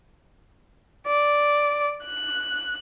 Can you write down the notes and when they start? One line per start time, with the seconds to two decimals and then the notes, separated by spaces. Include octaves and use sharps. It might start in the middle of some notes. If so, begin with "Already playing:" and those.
1.07 D5
2.05 F#6